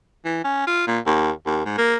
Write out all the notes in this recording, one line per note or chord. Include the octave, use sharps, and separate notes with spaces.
E3
C#4
F4
A#2
D#2
D#2
G#2
A#3